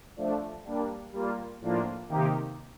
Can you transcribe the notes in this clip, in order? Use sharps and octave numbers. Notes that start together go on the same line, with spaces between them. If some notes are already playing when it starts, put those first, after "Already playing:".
F3 A3 D4
G3 A#3 D4
G3 A#3 F4
A2 F3 A#3 D4 F4
C3 D#3 A#3 D#4 G4